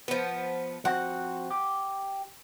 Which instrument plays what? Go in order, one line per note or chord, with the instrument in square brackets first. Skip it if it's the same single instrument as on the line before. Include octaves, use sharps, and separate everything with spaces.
[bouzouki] F3 B3
[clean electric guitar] F3 C4 F#4 [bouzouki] F#5
[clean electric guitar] G4